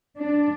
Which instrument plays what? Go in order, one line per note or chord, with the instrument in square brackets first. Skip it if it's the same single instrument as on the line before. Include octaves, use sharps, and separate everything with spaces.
[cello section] D4